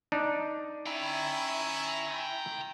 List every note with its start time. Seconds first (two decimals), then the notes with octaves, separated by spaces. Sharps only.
0.12 D4 D#4
0.86 C#4 E4 G5 A#5